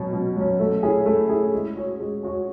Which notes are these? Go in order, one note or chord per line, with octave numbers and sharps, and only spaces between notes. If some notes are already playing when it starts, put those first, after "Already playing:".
Already playing: B2 F#3 C#4
B2
F#3 C#4
A3
C#4 E4 G#4
A3
C#4 E4 G#4
G#3
C#4 F#4 C#5
G#3
C#4 F#4 C#5